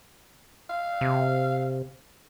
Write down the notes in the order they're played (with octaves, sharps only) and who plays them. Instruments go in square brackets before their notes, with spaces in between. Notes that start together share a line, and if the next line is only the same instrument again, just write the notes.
[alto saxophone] F5
[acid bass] C3